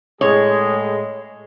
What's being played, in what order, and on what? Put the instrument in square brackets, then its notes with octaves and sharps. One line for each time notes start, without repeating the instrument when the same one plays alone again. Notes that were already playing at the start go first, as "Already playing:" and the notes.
[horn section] A2 G#3 G#4 [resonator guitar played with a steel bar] C#5